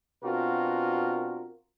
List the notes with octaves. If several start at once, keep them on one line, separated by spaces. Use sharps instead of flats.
B2 C4 D4 F4 F#4 A#4